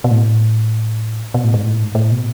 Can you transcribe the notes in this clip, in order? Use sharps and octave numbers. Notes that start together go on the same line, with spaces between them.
B2
A2
B2
A2
G#2
A2
G#2
A2
B2